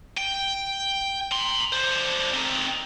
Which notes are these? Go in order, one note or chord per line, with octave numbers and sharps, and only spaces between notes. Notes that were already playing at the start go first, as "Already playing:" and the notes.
G5
A#5 C6
D3 C5
C4 D#4